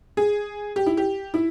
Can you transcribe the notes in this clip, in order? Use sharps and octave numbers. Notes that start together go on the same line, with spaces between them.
G#4
G4
E4
G4
E4